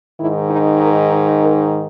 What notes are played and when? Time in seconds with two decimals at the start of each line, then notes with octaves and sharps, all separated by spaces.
0.20 G#2 D#3 E4
0.50 D#4
0.82 A#4
1.43 A#4